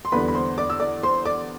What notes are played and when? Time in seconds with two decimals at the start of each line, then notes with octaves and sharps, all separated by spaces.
0.05 C6
0.12 E2 D3 G3 B3 D4 B4 B5
0.28 B5
0.35 C5 C6
0.58 D5 D6
0.70 E6
0.80 D5 D6
1.03 C5 C6
1.25 D5 D6